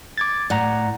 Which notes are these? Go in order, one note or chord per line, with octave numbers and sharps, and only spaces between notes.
D6 G#6 A6
A2 D5 F#5 A#5